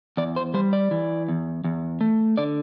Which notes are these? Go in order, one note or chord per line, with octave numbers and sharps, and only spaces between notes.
E2 D5
C5
G3 C5
D5
E3
E2
E2
A3
D3 D5